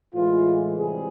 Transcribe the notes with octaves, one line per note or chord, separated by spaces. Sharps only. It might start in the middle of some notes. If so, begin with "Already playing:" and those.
A2 E3 G#3 F4
C3 E3 G3 G#4